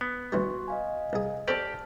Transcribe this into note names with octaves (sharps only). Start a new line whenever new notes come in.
B3
D2 E3 G3 F#4 C6 C#6
D#5 F5 G#5
C2 G#4
C4 G4 A4 C5 D5 A5 F6